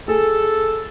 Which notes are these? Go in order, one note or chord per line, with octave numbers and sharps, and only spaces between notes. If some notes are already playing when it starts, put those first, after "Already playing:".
G#4 A4